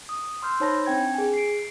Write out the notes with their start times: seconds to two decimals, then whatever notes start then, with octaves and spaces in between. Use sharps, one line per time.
0.09 D#6
0.42 C6 E6 F6 G6
0.60 D#4 C5 C#5 A5 B5 A#6
0.86 C4 D4 G5 G#6
1.14 G#4 G#5
1.33 C7 D7